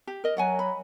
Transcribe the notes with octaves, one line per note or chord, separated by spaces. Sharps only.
G4
A#4 D#5
F#3 C#5 F#5 G#5
B5